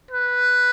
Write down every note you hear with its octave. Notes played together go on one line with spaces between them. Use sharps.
B4